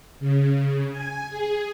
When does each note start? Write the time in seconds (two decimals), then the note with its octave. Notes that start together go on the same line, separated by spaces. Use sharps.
0.20 C#3
0.89 G#5
1.29 G#4